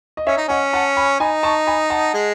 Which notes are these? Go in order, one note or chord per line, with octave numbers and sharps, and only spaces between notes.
D#5
C#4 C#5 E5
D#4
C#4 D#5 F#5
F#5 A5
G#5 B5
D#4 G#5 B5
A5 C#6
G#5 B5
F#5 A5
G#3